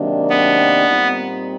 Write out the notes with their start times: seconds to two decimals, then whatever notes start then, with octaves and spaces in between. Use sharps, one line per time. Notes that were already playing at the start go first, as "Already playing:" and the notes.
Already playing: C3 D#3 F#3 A#3 D4
0.30 B3
0.86 A#2 G3 C4 D#4